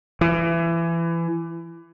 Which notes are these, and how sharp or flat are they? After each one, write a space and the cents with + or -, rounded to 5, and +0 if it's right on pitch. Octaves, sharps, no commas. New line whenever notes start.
E3 +25